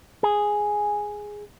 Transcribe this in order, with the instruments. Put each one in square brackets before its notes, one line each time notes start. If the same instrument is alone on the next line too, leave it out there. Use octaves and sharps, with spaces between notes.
[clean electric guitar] G#4